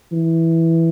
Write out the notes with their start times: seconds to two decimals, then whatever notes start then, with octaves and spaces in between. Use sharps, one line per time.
0.12 E3